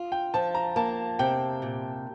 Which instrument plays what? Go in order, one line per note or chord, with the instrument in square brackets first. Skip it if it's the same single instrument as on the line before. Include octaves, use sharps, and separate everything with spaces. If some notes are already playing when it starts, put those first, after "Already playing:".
Already playing: [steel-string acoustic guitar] F4
[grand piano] G5
[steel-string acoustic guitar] F3 [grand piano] A5
[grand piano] A#5
[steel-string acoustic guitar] A#3 [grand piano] A5
[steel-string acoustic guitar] C3 [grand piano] G5
[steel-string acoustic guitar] A#2